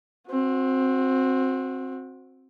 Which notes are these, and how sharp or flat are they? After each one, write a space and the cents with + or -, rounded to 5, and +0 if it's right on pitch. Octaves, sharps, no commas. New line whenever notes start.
C4 +10 F#4 -20